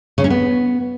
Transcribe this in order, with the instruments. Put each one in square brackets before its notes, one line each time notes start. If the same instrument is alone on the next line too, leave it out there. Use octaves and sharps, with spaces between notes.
[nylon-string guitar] C#3
C#4
B3